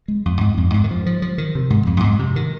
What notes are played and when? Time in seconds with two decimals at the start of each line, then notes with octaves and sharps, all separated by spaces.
0.08 G#3
0.26 F2
0.41 G#2
0.57 F2
0.74 G#2
0.84 D#3
0.90 F3
1.06 F3
1.22 F3
1.38 D#3
1.55 C3
1.70 G#2
1.87 F2
1.97 F2
2.04 G#2
2.19 C3
2.36 D#3